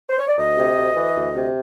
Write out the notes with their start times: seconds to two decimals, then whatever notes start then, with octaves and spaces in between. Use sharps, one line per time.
0.10 C5
0.19 C#5
0.28 D5
0.37 D2 D#5
0.57 C3
0.77 D2
0.95 E3
1.15 D2
1.35 C3